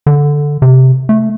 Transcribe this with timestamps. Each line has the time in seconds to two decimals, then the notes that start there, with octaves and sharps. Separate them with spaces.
0.06 D3
0.62 C3
1.09 A3